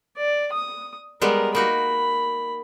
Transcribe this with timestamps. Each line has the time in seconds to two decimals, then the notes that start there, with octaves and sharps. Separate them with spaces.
0.17 D5
0.53 D#6
1.22 G3 G#3 B3 A#4
1.55 A#3 D#4 F#4 B5